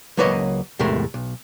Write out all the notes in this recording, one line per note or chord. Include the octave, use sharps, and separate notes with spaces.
C#2 F#3 A#3 B4 C#5 D#5
E2 A2 C3 G#3 A3 A#4
B1